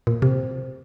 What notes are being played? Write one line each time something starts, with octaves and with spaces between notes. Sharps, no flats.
A#2
C3